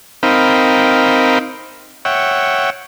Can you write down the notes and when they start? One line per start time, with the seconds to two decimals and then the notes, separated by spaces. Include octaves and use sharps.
0.23 C4 D#4 A#4 F5 G5 B5
2.05 C#5 E5 F#5 G5